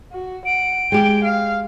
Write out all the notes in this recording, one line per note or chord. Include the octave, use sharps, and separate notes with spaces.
F#4
F#5 D7
G#3 G4 G5
F5